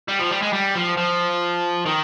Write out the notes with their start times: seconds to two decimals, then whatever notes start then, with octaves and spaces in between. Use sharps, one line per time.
0.08 G3
0.19 F3
0.31 G3
0.42 G#3
0.53 G3
0.75 F3
0.97 F3
1.86 D#3